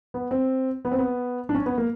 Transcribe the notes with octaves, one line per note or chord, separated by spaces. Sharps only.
B3
C4
B3
C4
B3
D4
C#4
B3
A#3